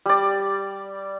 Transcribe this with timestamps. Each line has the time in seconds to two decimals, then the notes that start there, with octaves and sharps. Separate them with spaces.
0.06 G3 D5